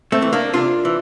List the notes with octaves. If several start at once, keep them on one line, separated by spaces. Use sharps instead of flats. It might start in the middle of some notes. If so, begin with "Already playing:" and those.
A3 C4
E3
A#3 D4
C3 D4 F4
E3